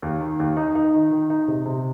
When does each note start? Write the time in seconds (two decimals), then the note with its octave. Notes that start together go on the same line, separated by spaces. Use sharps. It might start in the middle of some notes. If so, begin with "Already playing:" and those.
0.02 D#2
0.21 D#3
0.40 D#2
0.57 D#4
0.75 D#4
0.94 D#3
1.11 D#3
1.30 D#4
1.48 C3
1.66 C3